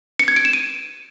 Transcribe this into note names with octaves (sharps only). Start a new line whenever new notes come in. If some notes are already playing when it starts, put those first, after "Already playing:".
C#7
G#6
D7
E7
D#7